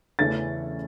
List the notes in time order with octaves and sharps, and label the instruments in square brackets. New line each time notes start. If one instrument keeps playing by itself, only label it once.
[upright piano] E2 C#3 E3 A3 C#4 A6